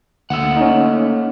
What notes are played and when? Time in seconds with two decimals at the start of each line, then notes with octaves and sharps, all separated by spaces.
0.30 D2 A3 A#3 F#5 E6
0.57 C#4 D#4